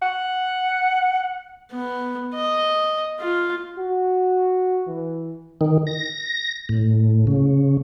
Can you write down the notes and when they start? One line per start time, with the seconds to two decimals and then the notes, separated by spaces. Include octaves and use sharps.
0.02 F#5
1.73 B3
2.34 D#5
3.20 F4
3.78 F#4
4.88 E3
5.61 D#3
5.87 A#6
6.69 A2
7.27 C#3